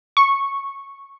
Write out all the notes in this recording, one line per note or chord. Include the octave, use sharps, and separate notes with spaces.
C#6